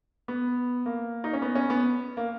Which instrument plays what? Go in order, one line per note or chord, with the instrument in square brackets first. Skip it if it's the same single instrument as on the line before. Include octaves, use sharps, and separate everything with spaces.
[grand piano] B3
A#3
D#4
C#4
B3
C#4
B3
A#3